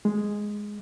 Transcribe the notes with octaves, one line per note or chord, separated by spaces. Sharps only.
G#3